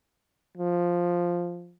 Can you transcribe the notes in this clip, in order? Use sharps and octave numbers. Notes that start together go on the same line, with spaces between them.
F3